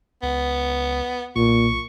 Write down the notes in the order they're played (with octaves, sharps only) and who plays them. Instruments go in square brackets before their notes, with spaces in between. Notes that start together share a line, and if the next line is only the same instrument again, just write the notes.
[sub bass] C#2 [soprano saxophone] B3
[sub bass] B1 [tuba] A#2 [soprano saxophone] C#6